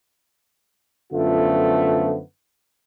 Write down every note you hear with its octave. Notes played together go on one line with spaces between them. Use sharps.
F#2 D3 F3 A3 B3 F4